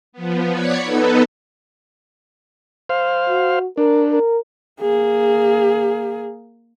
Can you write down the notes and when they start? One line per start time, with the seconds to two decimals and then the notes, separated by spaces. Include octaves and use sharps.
0.13 F3 B3
0.52 C#5 D5 F#5 G#6 B6 C#7
0.83 B3 D#4 A4 B4
2.89 C5 F5
3.29 F#4
3.78 D4 A#4
4.12 A#4
4.81 A#3 G#4